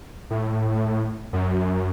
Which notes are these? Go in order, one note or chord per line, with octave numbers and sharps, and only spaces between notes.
A2
F#2